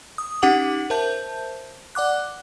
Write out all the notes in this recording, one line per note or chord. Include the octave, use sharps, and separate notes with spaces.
D#6
C#4 D#4 G4 F#5 D6 F#7
A#4 C5 E5 A5 G6
D5 F#5 D6 F#6